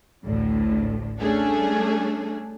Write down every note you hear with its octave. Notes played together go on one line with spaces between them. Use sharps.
A1 D2 A2 D3
G3 A3 C#4 D4 G#4 A4